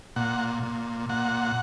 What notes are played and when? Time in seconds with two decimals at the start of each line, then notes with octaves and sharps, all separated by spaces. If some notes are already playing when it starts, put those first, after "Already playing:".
0.16 A#2 F#5
0.63 A#2
1.09 A#2 F#5